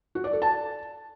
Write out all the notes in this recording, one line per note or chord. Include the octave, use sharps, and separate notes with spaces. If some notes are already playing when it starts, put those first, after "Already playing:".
F#4
D5
A4
A5